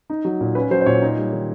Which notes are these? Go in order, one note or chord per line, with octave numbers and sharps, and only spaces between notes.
D#4
F#3
A#2
C#4 B4
F#3 C5
C5
A#2 C#5
D#4
G3
D#3